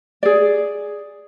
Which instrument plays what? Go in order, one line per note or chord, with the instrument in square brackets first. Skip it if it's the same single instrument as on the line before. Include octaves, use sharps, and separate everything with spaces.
[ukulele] G#4 D5